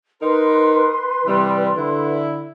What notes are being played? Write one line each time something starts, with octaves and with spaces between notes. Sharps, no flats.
D#4 A#4 B4 C6
C3 E3 G3
D3 E4